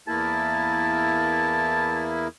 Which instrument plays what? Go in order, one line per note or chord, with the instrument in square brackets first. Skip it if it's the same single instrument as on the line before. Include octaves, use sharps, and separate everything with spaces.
[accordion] E2 A#3 E4 [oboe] A5